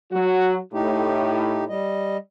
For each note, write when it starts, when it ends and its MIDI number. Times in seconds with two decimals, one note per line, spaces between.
0.13 0.56 54
0.13 0.56 66
0.74 1.74 45
0.74 1.64 63
0.74 1.64 67
1.69 2.17 55
1.69 2.17 75